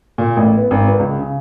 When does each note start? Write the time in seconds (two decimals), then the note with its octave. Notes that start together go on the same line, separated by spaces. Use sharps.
0.18 A#2
0.37 A1
0.58 B3
0.71 G#1
0.88 B4
0.99 C#2
1.18 C#3